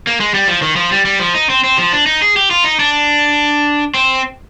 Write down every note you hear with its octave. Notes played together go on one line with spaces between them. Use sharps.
A#3
G#3
G3
F3
D#3
F3
G3
G3
F3
D#4
C4
C4
F3
D4
D#4
G#4
G4
F4
D#4
D4
C4